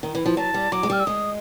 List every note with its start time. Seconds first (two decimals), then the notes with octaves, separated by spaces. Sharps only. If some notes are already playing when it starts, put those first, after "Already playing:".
0.03 D#3
0.15 E3
0.26 F3
0.37 F#3 A5
0.54 G3
0.72 F#3 D6
0.83 G#3
0.90 G3 F6
1.00 E6
1.06 G#3 D#6